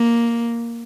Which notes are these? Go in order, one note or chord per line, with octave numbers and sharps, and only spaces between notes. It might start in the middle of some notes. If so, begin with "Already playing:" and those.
Already playing: A#3